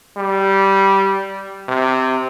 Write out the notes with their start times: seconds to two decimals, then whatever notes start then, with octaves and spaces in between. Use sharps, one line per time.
0.17 G3
1.68 C3